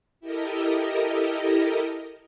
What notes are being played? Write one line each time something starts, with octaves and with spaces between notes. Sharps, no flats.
E4 G4 A4 A#4 D#5